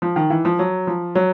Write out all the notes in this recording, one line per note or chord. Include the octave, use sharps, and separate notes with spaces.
F3
D#3
E3
F3
F#3
F3
F#3